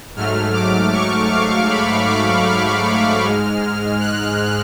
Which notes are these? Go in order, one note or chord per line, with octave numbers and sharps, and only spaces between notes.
G#2 F#3 A3 F6
D6
C#6
F5
B5
D6
F6
G#2 G#3
F#6